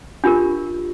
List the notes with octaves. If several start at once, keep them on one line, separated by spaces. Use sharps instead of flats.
D4 F4 G4 A#4